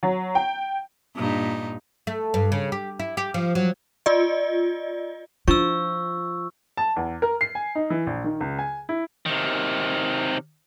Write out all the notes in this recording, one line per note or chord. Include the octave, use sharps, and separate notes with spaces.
F#3
G5
G2 A#2 D#4
A3
G2
C#3
G4
E4
G4
F3
F#3
F4 D5 D#5
F3 D4 C#6 E6
A5
E2
A#4
C7
G#5
D#4
E3
A#1
D#3
C#2
G#5
E4
C3 D#3